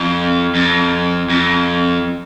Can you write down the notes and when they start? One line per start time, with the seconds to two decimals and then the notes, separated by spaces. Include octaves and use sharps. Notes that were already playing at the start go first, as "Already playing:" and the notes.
Already playing: F2
0.55 F2
1.30 F2